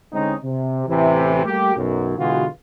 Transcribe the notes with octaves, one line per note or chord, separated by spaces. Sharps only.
D3 G#3 C4 C#4 D#4
C3
A1 C3 E3
G3 A3 A#3 G4
B1 F#2
B2 D3 E3 G#3 F4 F#4